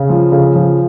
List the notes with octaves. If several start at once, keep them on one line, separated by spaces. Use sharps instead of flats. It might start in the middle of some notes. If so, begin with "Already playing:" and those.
Already playing: C#3
F3
C#3
F3